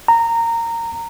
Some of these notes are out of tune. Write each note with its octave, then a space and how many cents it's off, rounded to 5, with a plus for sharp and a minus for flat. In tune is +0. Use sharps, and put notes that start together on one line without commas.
A#5 -15